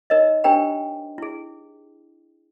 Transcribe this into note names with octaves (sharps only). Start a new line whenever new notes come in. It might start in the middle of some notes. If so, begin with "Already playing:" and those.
D#4 A#4 C#5 D#5
D4 G4 A#4 C5 G5 A#5
E4 G#4